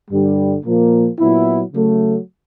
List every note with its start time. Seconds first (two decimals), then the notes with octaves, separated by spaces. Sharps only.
0.11 G2 D3 G3
0.65 A#2 F3 A#3
1.19 A#2 F#3 B3 E4
1.73 C#3 F#3 A3